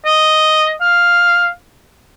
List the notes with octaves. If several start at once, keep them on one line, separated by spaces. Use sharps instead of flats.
D#5
F5